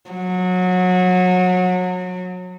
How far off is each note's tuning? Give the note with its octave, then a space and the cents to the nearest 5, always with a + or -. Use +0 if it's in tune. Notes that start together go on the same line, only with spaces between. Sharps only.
F#3 -25